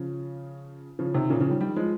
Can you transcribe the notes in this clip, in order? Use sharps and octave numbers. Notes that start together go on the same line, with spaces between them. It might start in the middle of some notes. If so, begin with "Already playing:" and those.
Already playing: C#3 F3
C#3 F3
C3 D#3
A#2 C#3
C#3 F3
D#3 G3
D#3 G3
F3 G#3